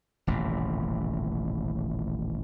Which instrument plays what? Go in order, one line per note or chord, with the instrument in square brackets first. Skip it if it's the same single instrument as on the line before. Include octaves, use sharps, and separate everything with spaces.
[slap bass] D#1 A1 F2 C3